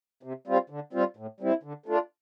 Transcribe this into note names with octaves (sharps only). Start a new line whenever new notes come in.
C3
G3 C4 F4
D3
G3 C4 F4
A2
G3 C4 E4
D3
A3 D4 F4